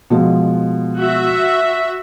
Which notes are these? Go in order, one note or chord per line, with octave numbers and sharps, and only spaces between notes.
B2 F3 G#3
F#4 E5